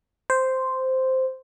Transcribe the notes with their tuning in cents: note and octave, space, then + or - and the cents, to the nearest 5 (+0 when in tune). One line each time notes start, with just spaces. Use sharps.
C5 -5